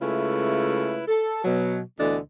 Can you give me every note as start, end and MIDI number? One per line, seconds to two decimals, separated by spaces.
0.02 1.03 49
0.02 1.03 56
0.02 1.03 57
0.02 1.03 64
0.02 1.03 65
0.02 1.03 71
1.07 1.40 69
1.44 1.79 47
1.44 1.79 54
1.99 2.17 38
1.99 2.17 47
1.99 2.17 50
1.99 2.17 52
1.99 2.17 62
1.99 2.17 75